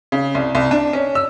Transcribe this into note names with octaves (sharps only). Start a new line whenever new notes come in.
C#3
C2
C2
D4
C#4
E6